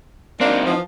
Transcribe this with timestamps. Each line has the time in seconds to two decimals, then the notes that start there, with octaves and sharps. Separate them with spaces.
0.41 F#3 A#3 C4 D4 D#4
0.65 E3 F3